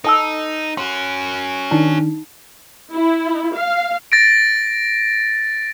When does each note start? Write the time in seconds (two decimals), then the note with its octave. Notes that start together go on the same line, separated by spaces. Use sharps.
0.05 D#4 A4 A5 E6
0.77 C#4 F#4 C6
1.71 D#3 D4 D#4 A5
2.94 E4
3.56 F5
4.12 A6 A#6 D7